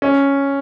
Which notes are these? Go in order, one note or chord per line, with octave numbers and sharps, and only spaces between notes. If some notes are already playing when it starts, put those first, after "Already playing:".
C#4